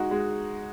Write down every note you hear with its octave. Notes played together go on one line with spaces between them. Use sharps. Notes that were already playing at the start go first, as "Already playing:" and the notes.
Already playing: G#3 D#4 F#4
G#3